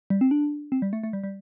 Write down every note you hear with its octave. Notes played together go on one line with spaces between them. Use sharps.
G3
C4
D4
C4
G3
A3
A3
G3
G3